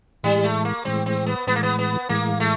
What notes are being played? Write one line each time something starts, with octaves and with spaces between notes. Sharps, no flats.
A2 E3 G3 G#3
A3
A#3
A2 E3 G#3 C4
C4
B3
A2 E3 G#3 B3
A#3
B3
B3
A2 E3 G#3 A#3
A3